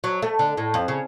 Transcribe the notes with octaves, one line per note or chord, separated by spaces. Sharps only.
F#3
A3
D3
A2
F2
C#3